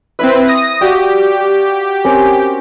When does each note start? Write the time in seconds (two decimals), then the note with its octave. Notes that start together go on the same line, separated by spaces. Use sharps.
0.19 C4 E4 B4 E5
0.48 D#6 A#6
0.81 F#4 G4 D5 F5
2.05 C4 C#4 A#4